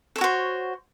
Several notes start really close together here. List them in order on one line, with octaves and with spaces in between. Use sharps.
A4 C#5 F#4 C5